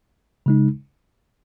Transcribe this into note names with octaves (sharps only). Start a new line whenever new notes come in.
C#3 G#3 D#4